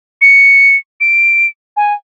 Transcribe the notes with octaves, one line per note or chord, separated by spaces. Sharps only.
C#7
D7
G#5